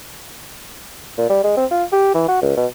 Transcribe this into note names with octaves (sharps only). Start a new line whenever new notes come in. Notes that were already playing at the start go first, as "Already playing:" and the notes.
A#2
G3
G#3
C4
F4
G4
E3
F#4
C#2
B2